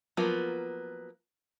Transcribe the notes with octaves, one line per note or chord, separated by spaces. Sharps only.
F3 F#3 A#3 B3 F4